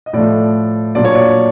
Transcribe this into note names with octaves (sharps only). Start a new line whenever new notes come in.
D#5
A2 F3 A3 D5
A#2 F#3 A#3 D4 D5
C#5
D5